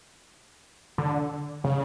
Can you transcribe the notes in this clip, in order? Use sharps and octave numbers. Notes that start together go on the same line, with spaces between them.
D3
C#3